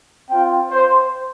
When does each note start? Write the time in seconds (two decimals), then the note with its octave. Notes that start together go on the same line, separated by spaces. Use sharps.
0.29 C4 F4 G5
0.70 C5